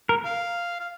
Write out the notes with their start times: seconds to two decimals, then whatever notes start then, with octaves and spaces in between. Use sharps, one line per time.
0.09 A#4
0.24 F5
0.80 F5